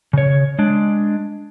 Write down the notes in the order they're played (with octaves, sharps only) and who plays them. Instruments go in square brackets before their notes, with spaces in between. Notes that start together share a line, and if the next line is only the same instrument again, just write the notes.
[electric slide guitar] C#3 C#5
G#3 D4